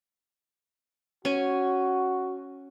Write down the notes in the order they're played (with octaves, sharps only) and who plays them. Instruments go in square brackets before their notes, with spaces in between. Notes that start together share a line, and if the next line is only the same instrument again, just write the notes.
[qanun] C#4 G#5 [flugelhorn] F#4